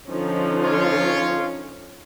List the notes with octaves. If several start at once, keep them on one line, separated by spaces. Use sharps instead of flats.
D3 F3 C#4 D#4
F4 C#5